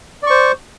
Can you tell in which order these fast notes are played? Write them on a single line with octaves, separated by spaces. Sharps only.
D5 C#6 C5